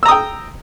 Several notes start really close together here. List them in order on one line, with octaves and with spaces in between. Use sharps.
E6 A#5 D#6 G5